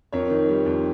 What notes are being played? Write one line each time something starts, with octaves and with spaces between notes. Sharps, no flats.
F2 A#4 C#5
D#3
G3
F2